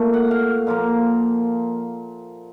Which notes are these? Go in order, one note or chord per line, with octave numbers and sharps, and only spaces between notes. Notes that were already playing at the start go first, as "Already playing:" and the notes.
Already playing: A#2 A3
F#5
F5
A#2 F3 A#3 C5